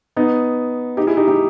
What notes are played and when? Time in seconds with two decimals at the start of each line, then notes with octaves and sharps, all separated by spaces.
0.17 B3 D#4
0.97 D#4 G4
1.07 E4 G#4
1.17 D#4 G4
1.28 D#4 G4